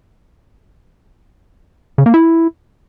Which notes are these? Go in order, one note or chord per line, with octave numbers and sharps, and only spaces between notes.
C#3
A#3
E4